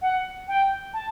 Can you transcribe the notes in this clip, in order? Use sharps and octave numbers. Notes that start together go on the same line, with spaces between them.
F#5
G5
A5